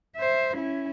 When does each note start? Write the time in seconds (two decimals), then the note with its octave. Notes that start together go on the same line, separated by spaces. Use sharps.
0.16 C5 E5
0.57 C#4 E4